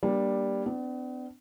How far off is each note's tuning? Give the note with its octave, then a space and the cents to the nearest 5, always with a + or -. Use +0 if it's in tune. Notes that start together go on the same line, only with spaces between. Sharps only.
G3 +0 A#3 +25 D4 +0
B3 +45 D4 +0